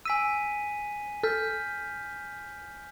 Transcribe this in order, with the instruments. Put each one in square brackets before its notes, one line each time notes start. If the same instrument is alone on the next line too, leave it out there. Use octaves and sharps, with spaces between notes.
[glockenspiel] G#5 B6 D#7 [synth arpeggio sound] E6
[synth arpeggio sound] A4 [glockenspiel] F6 G6 B6